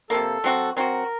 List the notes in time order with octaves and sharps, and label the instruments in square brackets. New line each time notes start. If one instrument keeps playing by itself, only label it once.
[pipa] C3 F3 A#3 [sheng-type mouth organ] A4
[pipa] F#3 C4 F#4
[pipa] F#3 C4 F#4 [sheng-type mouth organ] A#4